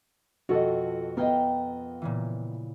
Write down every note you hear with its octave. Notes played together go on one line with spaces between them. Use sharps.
F2 B2 F#4 A4 D#5
B3 A#4 D#5 F5 G5
A#2 C#3 E3